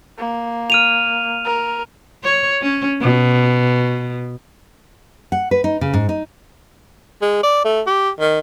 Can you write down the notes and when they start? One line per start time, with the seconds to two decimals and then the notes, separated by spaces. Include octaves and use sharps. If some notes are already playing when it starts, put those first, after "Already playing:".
0.18 A#3
0.70 F6 D#7 F7
1.45 A#4
2.24 C#5
2.62 C#4
3.02 B2
5.32 F#5
5.51 B4
5.64 D#4
5.81 C#3
5.93 G#2
6.09 D#4
7.22 G#3
7.43 D5
7.65 A3
7.87 G4
8.20 D#3